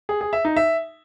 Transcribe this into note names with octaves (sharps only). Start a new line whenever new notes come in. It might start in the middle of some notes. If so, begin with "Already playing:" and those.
G#4
G#4
E5
D#4
E5